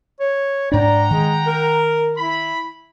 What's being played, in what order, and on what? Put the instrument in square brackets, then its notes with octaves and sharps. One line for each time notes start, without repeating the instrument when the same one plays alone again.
[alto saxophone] C#5
[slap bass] G#2 D4 [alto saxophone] D5 [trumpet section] F#5 G5 A#5
[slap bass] D#3 [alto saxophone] G#3
[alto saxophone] A#4
[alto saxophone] E4 [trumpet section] B5